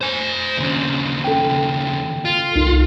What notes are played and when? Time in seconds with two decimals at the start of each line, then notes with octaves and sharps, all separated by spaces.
0.01 C5 G#5
0.58 D#2 C#3
1.24 A4 G5
2.25 F4
2.56 C2 D#4